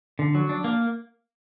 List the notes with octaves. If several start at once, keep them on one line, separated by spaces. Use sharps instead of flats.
D3
F#3
D4
A#3